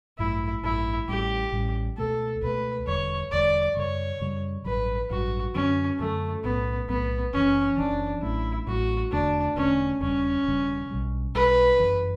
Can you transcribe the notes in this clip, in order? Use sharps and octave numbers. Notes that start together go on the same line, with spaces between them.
A1 G2 F#3 A3 E4
A1 G2 F#3 A3 E4
A1 A2 G3 C#4 G4
A1 A2 G3 C#4
C#2 B2 A3 A4
C#2 B2 A3 B4
E1 E2 D3 G3 C#5
E1 E2 D3 G3 D5
F#2 C#3 G3 C#5
F#2 C#3 G3
A1 G2 F#3 B4
A1 G2 F#3 F#4
F#2 D3 F#3 C#4
F#2 D3 F#3 A3
B1 A2 F#3 A3 B3
B1 A2 F#3 A3 B3
F#1 F#2 E3 C#4
F#1 F#2 E3 D4
A1 A2 F#3 A3 E4
A1 A2 F#3 A3 F#4
E1 E2 D3 A3 D4
E1 E2 D3 A3 C#4
E1 E2 C#3 G3 C#4
E1 E2 C#3 G3
B1 B2 G3
B1 B2 G3 B4
G1 F#2 E3